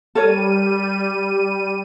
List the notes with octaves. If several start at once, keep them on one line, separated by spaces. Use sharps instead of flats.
G3 A4 A#4 C#5 D#7